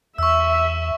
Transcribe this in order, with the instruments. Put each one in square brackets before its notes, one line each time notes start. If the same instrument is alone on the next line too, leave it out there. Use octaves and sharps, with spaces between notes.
[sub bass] E2 [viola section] E5 [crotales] C#6 E6